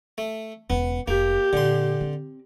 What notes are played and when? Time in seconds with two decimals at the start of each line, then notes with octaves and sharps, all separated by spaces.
0.18 A3
0.70 E1 C#3 B3
1.08 F1 A#3 G4
1.53 A#2 D3 C6
2.01 C4